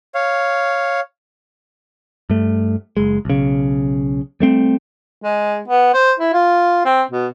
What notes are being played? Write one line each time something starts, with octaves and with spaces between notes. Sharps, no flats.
C#5 F5
G2 A3
F#1 G#3
B1 C#3
G3 A3 C4
G#3
B3
C5
E4
F4
C4
B2